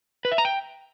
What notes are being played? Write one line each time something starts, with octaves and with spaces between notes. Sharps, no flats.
B4
E5
A#5
G5